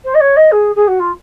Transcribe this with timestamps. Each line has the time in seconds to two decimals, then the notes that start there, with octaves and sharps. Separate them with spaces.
0.05 C5
0.15 D#5
0.21 C#5
0.36 D#5
0.52 G#4
0.75 G#4
0.88 F#4
1.00 F4